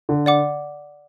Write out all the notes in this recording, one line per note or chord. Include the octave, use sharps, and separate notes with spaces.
D3
D5 F#5 D6